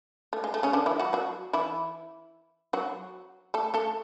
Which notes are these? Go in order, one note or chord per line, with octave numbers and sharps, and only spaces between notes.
A3
G#3
A3
C#3 C#4
D3 D4
E3 E4
F#3 F#4
F#3 F#4
E3 E4
F#3 F#4
A3 A4
A3 A4